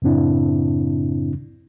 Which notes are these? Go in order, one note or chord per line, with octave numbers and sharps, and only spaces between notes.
F#2 A2 C#3 C4 D4 E4